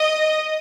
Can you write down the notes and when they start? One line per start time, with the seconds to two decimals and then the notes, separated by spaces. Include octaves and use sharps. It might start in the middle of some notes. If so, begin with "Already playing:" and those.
Already playing: D#5